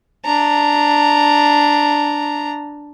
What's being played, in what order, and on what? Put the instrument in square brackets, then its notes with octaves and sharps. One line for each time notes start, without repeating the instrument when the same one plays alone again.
[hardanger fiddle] D4 A#5